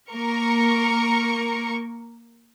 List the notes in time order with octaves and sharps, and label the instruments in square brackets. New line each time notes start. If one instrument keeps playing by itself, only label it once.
[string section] A#3 A#4 C#6